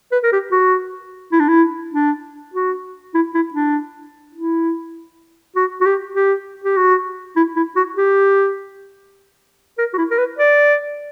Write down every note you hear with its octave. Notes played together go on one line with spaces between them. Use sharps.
B4
A#4
G4
F#4
E4
D4
E4
D4
F#4
E4
E4
D4
E4
F#4
F#4
G4
G4
G4
F#4
E4
E4
F#4
G4
A#4
F#4
E4
A#4
B4
D5